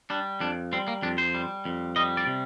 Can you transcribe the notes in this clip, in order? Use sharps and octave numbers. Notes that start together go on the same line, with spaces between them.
G3 D4
F2 D4
G3 C4
A#3
F2 D4
C5
G3
F2
G3 D#5
D5
C3